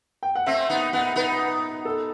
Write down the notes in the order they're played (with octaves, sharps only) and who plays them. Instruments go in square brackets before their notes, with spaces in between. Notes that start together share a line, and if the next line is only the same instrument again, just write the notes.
[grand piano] G5
F#5
[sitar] A3 C4 [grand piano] E5
[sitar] B3 D#4 [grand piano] F#5
[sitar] B3 D#4 [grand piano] F#5
[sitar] B3 D#4 [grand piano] B4
[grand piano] A4